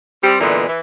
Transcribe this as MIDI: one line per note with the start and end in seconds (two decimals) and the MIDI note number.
0.22 0.39 55
0.22 0.39 60
0.40 0.64 46
0.40 0.64 50
0.40 0.64 52
0.40 0.64 56
0.40 0.64 59
0.68 0.80 52